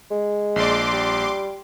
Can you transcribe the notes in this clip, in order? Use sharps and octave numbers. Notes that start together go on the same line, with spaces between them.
G#3
A#1 D5 C6 D6
G3